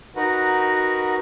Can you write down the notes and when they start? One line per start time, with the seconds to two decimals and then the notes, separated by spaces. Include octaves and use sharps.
0.16 D#4 F#4 A#4 B4 F#5